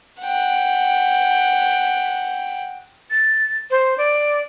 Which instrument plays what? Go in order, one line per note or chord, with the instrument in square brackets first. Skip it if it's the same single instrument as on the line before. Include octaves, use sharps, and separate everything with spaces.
[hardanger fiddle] F#5 G5
[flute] A6
C5
D5